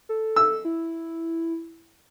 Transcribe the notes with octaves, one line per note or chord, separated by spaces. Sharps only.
A4
E6
E4